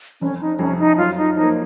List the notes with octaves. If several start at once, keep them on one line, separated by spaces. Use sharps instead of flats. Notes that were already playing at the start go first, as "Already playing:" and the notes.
F1 C#4
D#4
F2 C3 C#4
D#4
F#2 F4
D#4
F3 A#3 D#4